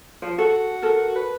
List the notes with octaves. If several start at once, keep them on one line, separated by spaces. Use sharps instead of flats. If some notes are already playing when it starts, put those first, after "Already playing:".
F3 C5
F#4 A4
A4 A#4
B4